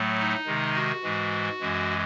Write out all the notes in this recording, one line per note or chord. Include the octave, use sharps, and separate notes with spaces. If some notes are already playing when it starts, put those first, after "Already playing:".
Already playing: A2 F#3 A3
D#4
C3 D#3 G#3
F#4
G#2 E3 G#3
F#2 E3 G#3